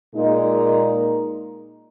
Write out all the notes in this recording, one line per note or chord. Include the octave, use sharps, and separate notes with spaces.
A#2 G#3 D#4 A#4